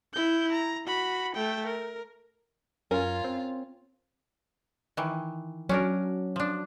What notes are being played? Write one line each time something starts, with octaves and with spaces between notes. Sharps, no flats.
E4 G6
A#5
F#4 B5
A3 G5
A#4
F#2 C#4 F4 A#4
C4
D#3 E3
F#3 C#4 D4 A#4
F3 D4